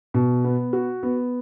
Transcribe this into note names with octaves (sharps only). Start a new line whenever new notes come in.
B2
B3
F#4
B3